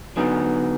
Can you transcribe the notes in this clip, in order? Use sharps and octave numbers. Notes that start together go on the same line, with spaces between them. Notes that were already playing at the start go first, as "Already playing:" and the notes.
D3 F#3 B3 D#4 G#4